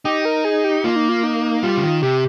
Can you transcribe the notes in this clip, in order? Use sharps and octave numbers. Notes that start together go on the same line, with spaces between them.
D#4 G4
A#4
G#4
G4
A#3 F4
D#4
F4
D#4
G3 F4
C#3
D#3
C3 G4